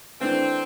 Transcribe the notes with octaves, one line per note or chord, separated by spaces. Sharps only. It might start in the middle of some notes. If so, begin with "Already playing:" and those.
E3 A3 C4 D4